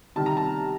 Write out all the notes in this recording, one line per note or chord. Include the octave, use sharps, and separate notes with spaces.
C3 D#3 G3 A5
A#5
A5